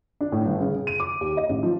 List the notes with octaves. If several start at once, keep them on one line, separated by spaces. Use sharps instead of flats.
D4
A2
G1
C#3
G#4
D#7
D6
D#2
D#5
A1
F3